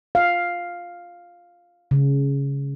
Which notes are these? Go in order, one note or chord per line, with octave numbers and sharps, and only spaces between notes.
F5
C#3